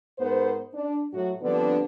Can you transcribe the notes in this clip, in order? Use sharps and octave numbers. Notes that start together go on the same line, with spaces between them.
G#2 B3 A#4 C5
D4
A2 F#3 F#4
D3 F3 G3 B3 C4 D4